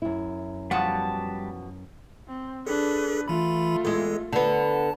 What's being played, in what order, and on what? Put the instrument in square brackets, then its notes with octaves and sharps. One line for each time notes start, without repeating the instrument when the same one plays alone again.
[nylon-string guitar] F#2 E4
[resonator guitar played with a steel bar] B2 F3 F#5 [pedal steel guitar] G3 A5
[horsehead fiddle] C4
[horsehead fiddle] D4 B4 [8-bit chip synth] G#4 A4
[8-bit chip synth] E3 B5 [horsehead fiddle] A3 F4
[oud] E2 G#3 [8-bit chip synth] A4
[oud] D3 B3 [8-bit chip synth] A5